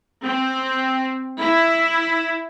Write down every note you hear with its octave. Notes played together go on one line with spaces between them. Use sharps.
C4
E4